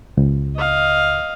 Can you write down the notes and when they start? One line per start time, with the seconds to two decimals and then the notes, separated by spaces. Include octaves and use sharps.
0.17 C#2
0.56 D#5 F5